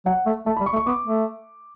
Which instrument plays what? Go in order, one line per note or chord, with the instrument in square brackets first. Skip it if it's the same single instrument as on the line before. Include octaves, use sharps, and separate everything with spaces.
[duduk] F#3 [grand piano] F#5
[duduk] A3
[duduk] A3 [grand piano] A5
[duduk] G3 [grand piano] B5
[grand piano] C#6
[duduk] A3
[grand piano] C#6
[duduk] B3 [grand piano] D6
[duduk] A3